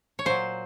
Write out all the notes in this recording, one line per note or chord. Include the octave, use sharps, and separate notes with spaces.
C#5
A#2 F#3 C5